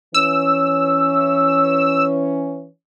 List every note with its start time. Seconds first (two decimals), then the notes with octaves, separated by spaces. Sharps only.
0.14 E3 C#4 E6